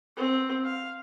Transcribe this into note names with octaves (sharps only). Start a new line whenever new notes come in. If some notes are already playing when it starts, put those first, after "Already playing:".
C4
F5